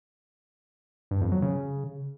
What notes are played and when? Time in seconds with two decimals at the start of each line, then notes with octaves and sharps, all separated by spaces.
1.11 G2
1.21 F2
1.32 F#3
1.42 C#3